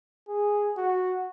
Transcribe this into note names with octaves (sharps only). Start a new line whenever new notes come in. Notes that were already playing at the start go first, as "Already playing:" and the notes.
G#4
F#4